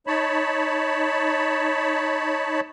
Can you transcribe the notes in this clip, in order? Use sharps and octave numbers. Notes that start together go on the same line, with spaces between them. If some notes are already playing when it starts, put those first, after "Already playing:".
D#4 C#5 A5 B5